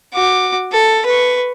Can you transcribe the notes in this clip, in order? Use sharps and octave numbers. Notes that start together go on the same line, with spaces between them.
F#4 D6
A4
B4 C#6